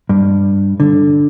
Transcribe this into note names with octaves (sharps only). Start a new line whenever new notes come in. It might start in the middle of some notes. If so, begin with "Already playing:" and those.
G2
D3